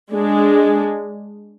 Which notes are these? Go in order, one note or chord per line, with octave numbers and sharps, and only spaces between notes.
G#3 D4 G#4